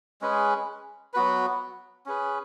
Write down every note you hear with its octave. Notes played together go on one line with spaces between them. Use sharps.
G#3 C#4 G#4 B4
F#3 B3 F#4 B4
C#4 G#4 B4